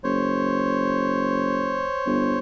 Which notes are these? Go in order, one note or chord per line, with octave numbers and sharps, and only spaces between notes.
F#1 C5 C#5
G1